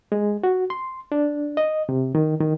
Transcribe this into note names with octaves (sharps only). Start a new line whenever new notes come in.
G#3
F#4
C6
D4
D#5
C3
D#3
D#3